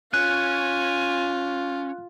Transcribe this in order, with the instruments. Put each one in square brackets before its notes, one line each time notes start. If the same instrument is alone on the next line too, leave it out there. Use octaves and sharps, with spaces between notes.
[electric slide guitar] C#4 [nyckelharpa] F4 [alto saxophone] G#5 [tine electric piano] F#6